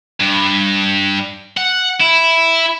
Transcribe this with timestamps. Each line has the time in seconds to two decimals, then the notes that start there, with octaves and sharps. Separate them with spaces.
0.20 G2
1.57 F#5
2.00 E4